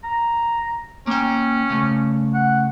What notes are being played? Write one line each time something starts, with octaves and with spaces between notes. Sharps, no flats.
A#5
A#3 C#4 G5
C#3 A3
F#5